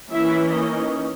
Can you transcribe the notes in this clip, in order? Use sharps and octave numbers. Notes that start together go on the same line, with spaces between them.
E3 A#3 C#4 E4 E5
D#4 D#5